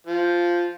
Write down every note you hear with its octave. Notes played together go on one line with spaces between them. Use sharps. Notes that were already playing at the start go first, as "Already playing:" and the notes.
F3